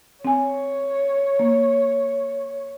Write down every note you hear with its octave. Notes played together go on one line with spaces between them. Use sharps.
C4 C#5 G#5
A#3